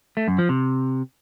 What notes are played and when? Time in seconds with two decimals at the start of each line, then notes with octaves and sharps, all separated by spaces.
0.17 A3
0.28 F#2
0.38 F3
0.49 C3